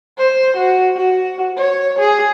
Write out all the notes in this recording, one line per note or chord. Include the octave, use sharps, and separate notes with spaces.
C5
F#4
F#4
C#5
G#4